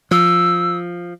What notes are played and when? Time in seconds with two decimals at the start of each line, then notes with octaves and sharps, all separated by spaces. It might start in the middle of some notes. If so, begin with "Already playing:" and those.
0.11 F3 E6